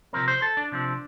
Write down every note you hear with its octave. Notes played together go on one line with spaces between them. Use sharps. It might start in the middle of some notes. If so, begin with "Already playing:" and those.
C3 F3 C4 A#4
C5
A4
D4
C3 F3 C4